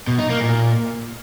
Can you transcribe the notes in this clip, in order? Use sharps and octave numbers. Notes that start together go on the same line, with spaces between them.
B2
D#4
A#3
A#2